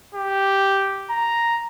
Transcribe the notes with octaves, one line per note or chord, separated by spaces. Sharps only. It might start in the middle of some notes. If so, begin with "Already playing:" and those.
G4
A#5